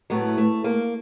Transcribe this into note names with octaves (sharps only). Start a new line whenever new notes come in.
A2 F#3 A3 B3
A3
A#3